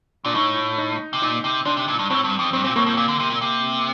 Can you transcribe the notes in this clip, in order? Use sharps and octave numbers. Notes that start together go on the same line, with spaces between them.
A#2 D4
A2 D#4
D#4
C3
A#2 D#4
C3
C3 D4
C3
A#2
G2
A2 C4
G2
F2
G2 C4
A#2 C4
A2 A#3
A2
A#2
D3
C3
A#2
C3